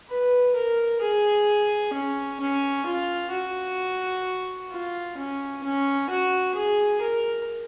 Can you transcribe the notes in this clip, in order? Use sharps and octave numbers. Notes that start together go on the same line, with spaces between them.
B4
A#4
G#4
C#4
C#4
F4
F#4
F4
C#4
C#4
F#4
G#4
A#4